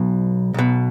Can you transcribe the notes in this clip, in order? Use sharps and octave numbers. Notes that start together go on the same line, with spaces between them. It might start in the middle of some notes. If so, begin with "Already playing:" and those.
Already playing: B1 B2
B1 B2